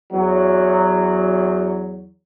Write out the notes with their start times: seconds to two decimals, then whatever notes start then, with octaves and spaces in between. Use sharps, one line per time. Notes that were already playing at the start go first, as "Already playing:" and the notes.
0.12 E2 F#3